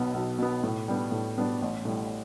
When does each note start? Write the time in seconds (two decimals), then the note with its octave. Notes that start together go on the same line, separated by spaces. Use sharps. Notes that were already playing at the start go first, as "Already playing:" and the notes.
Already playing: B1 B2 B3
0.14 B1
0.38 B2 B3
0.64 A2
0.88 G3 B3 D4
1.12 A2
1.37 G3 B3 D4
1.62 A1
1.85 A2 G3